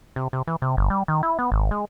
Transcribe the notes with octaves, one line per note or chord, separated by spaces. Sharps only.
C3
C3
E3
C3
G1
G3
D#3
E4
B3
G#1
G#3